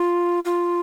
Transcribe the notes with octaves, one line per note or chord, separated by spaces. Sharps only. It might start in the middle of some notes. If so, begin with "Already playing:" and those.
Already playing: F4
F4